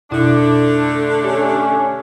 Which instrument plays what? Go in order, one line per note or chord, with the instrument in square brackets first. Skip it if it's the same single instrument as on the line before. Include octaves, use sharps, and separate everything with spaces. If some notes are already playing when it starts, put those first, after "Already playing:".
[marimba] F2 B2 E4 [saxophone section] D3 A3 D4
[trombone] C#4 [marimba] G4